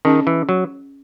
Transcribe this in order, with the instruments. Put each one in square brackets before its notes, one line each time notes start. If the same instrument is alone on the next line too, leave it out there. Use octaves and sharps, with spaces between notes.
[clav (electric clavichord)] D#3 [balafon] C#4 G#4 D#5
[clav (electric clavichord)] E3
F#3